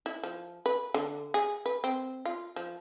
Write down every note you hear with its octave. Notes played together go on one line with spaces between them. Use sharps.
E4
F3
B4
D3
G#4
B4
C4
F4
F3